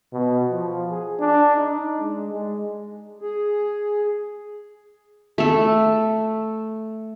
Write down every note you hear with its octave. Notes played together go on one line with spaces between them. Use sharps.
B2
F3
G#4
D4
D#4
G#3
G#3
G#4
A3 A4